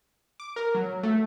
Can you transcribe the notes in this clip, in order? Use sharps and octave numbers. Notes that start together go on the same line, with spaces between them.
D6
A#4
F#3
A3